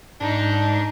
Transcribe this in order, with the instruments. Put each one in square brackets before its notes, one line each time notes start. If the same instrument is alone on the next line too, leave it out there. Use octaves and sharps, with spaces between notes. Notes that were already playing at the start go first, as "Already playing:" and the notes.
[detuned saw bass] G#2 [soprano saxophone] D4 [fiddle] D#4